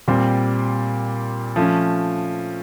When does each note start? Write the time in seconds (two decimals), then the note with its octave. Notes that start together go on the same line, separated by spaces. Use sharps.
0.08 A#2 G3 C4
1.56 F3 A3 C#4